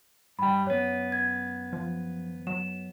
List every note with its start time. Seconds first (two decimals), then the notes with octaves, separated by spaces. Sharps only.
0.39 G2 G3 G5 B5
0.67 F#2 B3 C#5
1.12 G#6
1.73 F3
2.47 F#3 E7